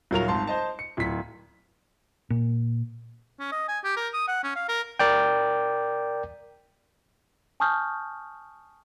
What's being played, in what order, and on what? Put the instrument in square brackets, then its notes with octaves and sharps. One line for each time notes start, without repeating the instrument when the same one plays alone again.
[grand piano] D#1 F#3 A#4 F7
G#1 A5 C6
C5 D#5 A5
C#7
D1 B6
[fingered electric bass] A#2
[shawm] C#4
D#5
G#5
G4
A#4
D#6
F#5
C#4
F5
A#4
[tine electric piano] A#4 D5 G5
[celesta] G#5 A5 C#6 D#6 F6 G6